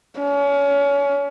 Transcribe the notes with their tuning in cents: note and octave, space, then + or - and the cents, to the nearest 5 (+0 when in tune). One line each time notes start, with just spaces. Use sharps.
C#4 +30